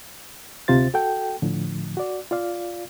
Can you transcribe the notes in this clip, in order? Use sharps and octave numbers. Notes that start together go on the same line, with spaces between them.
D2 C3 F4 C5 A6
F#4 A4 G5
A2 D3 F3
F#4 D5
F4 D5 F5